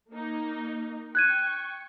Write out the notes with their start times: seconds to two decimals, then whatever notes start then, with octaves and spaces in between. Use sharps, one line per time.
0.11 A#3 D#4
1.15 G5 C#6 F#6 G#6 D#7